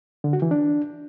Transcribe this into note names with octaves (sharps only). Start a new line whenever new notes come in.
D3
F#4
E3
D4